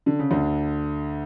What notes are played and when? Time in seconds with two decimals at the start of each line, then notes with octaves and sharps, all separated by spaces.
0.06 D3
0.19 C#3
0.31 D2 D3